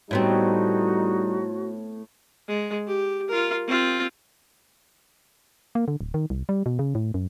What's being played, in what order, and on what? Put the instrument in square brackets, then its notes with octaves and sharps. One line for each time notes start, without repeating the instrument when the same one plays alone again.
[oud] A2 B3 C4 [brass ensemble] G3 D#4 [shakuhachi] F#4
[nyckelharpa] G#3
G4
F4 A#4
C4 F4
[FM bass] A#3
D3
D1
D#3
C2
G3
B2
C#3
A2
F#2